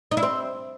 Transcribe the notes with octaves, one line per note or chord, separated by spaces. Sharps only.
D#4
E4
C4